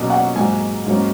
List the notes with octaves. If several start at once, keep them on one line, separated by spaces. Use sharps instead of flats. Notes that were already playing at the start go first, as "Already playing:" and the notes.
Already playing: B2 F#3 A#3 C#4
F#5
G#2 F#3 A#3 G#5
G#2 F#3 A#3 C#4